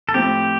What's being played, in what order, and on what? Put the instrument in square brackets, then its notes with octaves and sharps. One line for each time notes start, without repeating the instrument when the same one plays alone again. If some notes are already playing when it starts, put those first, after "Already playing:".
[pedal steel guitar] A4
[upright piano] A2 F3 C4 [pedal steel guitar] G4